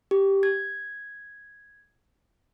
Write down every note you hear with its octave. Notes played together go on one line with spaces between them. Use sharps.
G4
G#6